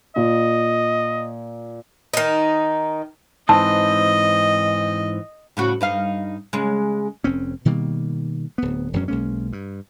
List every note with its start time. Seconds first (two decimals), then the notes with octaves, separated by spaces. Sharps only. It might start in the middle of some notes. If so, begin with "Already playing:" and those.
0.16 A#2 D#5
2.14 D#3 D#4
3.49 G#2 E3 C4 D#5 A5
5.57 A2 C#3 F#4
5.81 G2 D#4 F5
6.53 C#3 G#3
7.24 F1 C4 C#4
7.65 B2 D#3 G3 A#3
8.58 D1 B3
8.93 E1 F#2 F#3 C#4
9.08 B1 G#3 A#3 C#4
9.53 G2